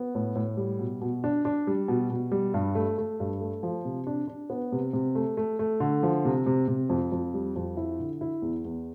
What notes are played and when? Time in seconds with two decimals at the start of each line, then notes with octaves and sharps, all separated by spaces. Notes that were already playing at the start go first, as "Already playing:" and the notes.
Already playing: B3
0.15 A2
0.36 A2
0.57 G3
0.79 B2
1.01 B2
1.24 D4
1.45 D4
1.67 G3
1.88 B2
2.10 B2
2.32 G3
2.54 G2
2.75 A3
2.98 A3
3.20 G2
3.41 A3
3.63 F3
3.85 C3
4.07 D4
4.28 D4
4.50 B3
4.72 C3
4.93 C3
5.15 A3
5.37 A3
5.59 A3
5.80 D3
6.03 F3
6.25 C3
6.46 C3
6.68 C3
6.89 F2
7.12 F2
7.34 G3
7.56 F2
7.77 E4
7.99 D3
8.21 E4
8.42 E2
8.65 E2